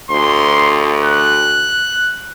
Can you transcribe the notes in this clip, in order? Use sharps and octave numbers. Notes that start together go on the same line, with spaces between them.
D2 C6
F#6